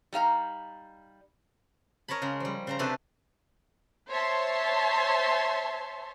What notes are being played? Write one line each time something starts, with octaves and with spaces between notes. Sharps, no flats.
G3 D#4 F5 A#5
A#4 C#5 D#5 A5 B5
C#3 G#3 A#5
F3 G3
C#3 C5 A#5
C3 A3 D4 G4 A4 B4
C5 C#5 E5 A5 C6